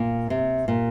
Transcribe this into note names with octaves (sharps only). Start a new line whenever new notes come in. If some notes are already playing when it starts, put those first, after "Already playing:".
Already playing: A#2
C3
A#2